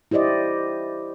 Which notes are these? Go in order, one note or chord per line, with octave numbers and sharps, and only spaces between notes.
E4 G4 C5 D5 D#5